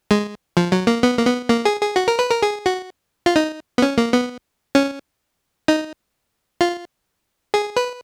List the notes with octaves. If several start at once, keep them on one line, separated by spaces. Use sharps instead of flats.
G#3
F3
F#3
A#3
B3
A#3
B3
A#3
G#4
G#4
F#4
A#4
B4
A#4
G#4
F#4
F4
D#4
B3
C#4
A#3
B3
C#4
D#4
F4
G#4
B4